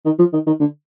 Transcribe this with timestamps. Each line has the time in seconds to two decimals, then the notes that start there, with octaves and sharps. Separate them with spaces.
0.05 D#3
0.19 F3
0.33 D#3
0.47 D#3
0.60 D3